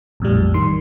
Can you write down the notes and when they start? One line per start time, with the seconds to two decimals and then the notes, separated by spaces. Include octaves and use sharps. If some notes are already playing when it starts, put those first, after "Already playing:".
0.20 A#1 F2 A2 G3
0.54 D#3 C6